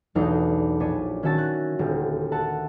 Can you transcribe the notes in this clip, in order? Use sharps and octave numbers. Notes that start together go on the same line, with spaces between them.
B1 E2 A3 D4 D#4
A#1 D4 C#5 B6 D#7
D#3 C#4 F#4 E5 A5 A6
F#6 G#6 A#6
D#1 D2 G4
E5 F#5 A5